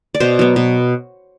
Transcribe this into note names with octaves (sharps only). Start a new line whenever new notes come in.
D5
B2 C5
F#3 B3
B2